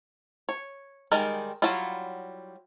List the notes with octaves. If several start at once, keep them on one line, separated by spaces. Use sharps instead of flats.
C#5
D#3 G3 G#3 A#4
F#3 G3 E4 F4